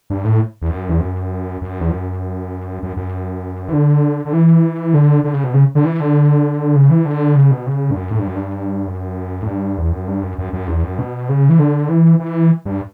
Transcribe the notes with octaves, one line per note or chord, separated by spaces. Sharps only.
G2
A2
E2
F#2
E2
F#2
F#2
E2
F#2
F#2
F#2
E3
D3
D3
E3
D3
D3
C#3
B2
C#3
D3
E3
D3
C#3
E3
D3
C#3
B2
C#3
G2
F#2
A2
G2
F#2
G2
F#2
A2
G2
E2
F#2
G2
F#2
F#2
F#2
E2
F#2
B2
C#3
E3
D3
E3
E3
G2